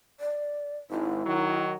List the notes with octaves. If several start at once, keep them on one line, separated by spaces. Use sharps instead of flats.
D5
G#1 G#2 E4
D#3 F#3